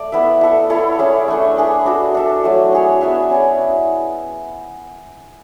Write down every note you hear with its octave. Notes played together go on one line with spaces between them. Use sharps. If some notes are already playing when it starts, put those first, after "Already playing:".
Already playing: A3 D5
B3 E4 B4 E5
E4 A4 E5
E4 A4 C#5
C#4 G#4 D5
A3 D4 A4
D4 G#4 B4
D4 F#4 A4
D4 A4 E5
F#3 A3 D4
D4 G#4 C#5
B3 E4 B4 E5
C#4 G#4 D5